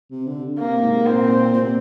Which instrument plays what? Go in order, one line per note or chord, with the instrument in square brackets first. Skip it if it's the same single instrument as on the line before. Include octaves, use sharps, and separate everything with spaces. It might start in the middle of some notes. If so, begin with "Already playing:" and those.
[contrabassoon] C3
D3
[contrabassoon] C3 [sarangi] A#3
[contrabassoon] G#2
[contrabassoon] A#2 [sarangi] C4
[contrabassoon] A#2
C3